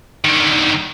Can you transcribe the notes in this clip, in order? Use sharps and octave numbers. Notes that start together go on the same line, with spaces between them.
D3 D#3